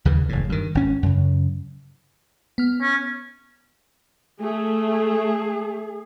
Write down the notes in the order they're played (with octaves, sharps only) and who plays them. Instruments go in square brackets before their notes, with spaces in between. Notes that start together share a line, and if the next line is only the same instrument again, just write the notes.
[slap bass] D#2 C#3 E3
F#1 E2 A2
G2 D#3
G#1 C#4
F#2 C#3
[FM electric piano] B3 F6
[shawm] C#4
[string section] A3 [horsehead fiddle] G#4